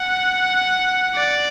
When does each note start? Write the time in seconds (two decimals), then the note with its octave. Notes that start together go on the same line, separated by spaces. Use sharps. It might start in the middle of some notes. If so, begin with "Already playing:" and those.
Already playing: F#5
1.15 D5